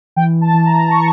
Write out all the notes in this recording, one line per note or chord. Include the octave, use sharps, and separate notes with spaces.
E3 G5
A5
E3
A#5
C#6